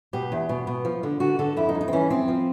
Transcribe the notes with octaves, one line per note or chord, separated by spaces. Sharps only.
B2 G4
E2
B2
B2
F3
D3
D3 F#4
D3 A4
F2 E4
D#4
F2
D#4
C4
E3 C#4
F2 C4
F3